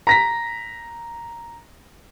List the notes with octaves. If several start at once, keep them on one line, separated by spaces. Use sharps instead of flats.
A#5 A#6 B6